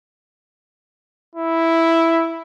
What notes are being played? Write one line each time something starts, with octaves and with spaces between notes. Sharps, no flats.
E4